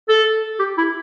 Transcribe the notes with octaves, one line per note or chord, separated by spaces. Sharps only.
A4
G4
E4